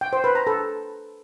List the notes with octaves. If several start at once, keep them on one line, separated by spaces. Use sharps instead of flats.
G5
C5
B4
A#5
A4